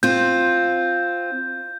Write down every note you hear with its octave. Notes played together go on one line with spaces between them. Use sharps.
C4 F4 G6